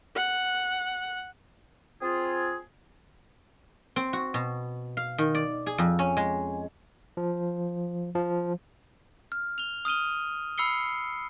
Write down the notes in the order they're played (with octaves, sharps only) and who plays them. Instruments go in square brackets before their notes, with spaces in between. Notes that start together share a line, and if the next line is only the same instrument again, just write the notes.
[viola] F#5
[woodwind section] C4 F4 G#4
[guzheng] C4
F#4
B2
F5
D#3
D5
G#4
F2
C#4
G#3
[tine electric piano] F3
F3
[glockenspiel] F6
F7 G7
D#6 F6 D#7 G7
B5 E6 C7 C#7 G7